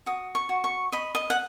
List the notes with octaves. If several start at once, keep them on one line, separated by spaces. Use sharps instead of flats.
F#4 D#6
C#6
F#4
C#6
D#5 B5
D#5
F#5